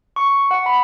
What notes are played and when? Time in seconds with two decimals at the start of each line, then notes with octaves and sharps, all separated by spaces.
0.16 C#6
0.51 F#5
0.66 B5